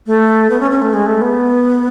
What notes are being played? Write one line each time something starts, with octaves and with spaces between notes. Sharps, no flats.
A3
B3
C#4
C#4
A3
G#3
A3
B3